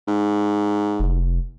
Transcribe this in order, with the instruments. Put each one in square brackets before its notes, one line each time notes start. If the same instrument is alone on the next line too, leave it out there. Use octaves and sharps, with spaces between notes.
[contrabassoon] G#2
[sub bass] F1